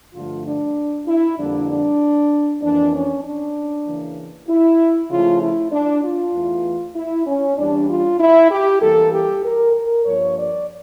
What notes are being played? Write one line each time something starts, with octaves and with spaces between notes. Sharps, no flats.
G2 D3 F3 A3 F4
D4
E4
F2 D3 G3 A#3 D4
D4
F2 E3 A#3 D4
C#4
D4
C#3 E3 A#3
E4
C#3 F3 A3 F4
E4
D4
F4
E2 E3 A3
E4
C#4
E2 E3 G3 D4
F4
E4
G4
E2 E3 G3 A#3 A4
G4
A#4
A#4
G2 F3 A#3 C#5
D5